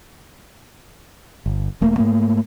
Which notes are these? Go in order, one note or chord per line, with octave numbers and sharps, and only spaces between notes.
G1
E1 A3 A#3
G#2 A3 A#3